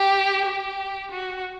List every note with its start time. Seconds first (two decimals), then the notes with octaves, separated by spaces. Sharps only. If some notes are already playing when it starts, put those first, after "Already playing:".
Already playing: G4
0.46 G4
1.11 F#4